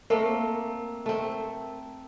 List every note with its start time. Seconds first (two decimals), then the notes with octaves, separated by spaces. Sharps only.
0.10 A3 A#3 C4 A#4
1.06 A3 C4